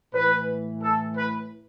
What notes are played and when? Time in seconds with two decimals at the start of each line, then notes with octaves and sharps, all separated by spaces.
0.14 A2 E3 B4
0.81 A4
1.16 B4